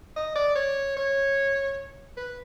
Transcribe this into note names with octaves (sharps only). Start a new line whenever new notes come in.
D#5
D5
C#5
C#5
B4